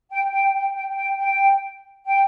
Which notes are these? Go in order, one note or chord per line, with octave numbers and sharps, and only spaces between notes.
G5
G5
G5
G5
G5
G5
G5